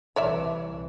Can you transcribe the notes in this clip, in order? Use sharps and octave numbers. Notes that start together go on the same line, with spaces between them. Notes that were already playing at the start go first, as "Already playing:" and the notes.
C2 E3 C#5 D5 E5